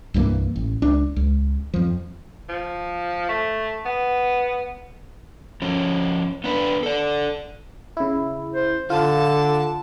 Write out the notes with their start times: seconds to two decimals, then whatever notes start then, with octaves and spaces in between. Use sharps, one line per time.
0.14 C2 G2 E3 A#3
0.56 A1
0.82 C#2 D4
1.16 C#2
1.74 F2 F3
2.49 F3
3.29 A3
3.85 B3
5.62 F3 C#4
6.44 B3 D4 B4
6.83 A4 D5
7.97 C#3 E4
8.54 C5
8.90 D3 F4 A5